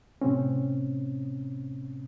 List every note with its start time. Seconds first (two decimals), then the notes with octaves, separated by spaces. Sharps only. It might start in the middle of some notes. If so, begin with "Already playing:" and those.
0.21 A2 C3 C4 C#4